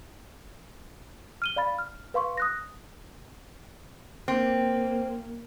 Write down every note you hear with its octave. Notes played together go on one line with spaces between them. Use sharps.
F6 D#7 G7
D5 F5 B5 A6
F6
B4 F5 C6 C#6
D#6 F#6 A#6
A#3 C4